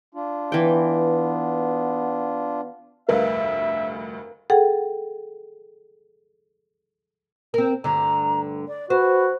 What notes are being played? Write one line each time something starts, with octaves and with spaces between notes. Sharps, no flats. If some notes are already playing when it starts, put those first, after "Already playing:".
D4 F4
E3 B3 G5
F1 D2 G2 A#4 B4 E5 F5
G#4 A4 F#5 G5
C4 A#4
D2 G2 D3 A#5
D5
F#4 B4 C5